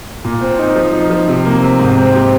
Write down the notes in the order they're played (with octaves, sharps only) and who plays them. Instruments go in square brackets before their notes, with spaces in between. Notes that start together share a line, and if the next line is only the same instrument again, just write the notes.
[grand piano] A#2
C4
D#4
F3
D#4
F3
C3
A#3
C3
G#2
C4
G4